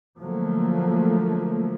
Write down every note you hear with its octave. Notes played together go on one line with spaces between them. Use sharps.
D3 F3 F#3 A3 A#3